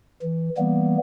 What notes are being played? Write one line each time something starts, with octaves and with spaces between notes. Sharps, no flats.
E3
E3 G3 A#3 B3